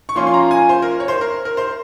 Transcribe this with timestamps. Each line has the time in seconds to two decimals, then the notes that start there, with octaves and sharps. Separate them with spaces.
0.09 C#6
0.16 F3 A#3 C#4 F4 C6
0.27 C6
0.34 A#5
0.51 G#5
0.69 C5
0.82 A#4
1.00 C#5
1.08 C5
1.21 A#4
1.45 A#4
1.57 C5